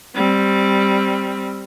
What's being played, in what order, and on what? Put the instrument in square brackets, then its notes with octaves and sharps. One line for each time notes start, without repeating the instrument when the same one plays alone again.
[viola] G3 C4